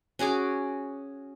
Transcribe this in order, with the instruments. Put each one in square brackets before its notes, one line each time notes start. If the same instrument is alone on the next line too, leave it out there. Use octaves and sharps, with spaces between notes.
[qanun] C#4 F#4 G#4 D6